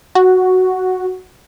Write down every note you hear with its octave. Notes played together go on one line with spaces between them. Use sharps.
F#4